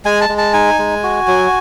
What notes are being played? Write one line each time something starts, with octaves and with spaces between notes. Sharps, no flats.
G#3 G#5
A5
G#3
A5
D#4 G#5
G#3
F#4
F#3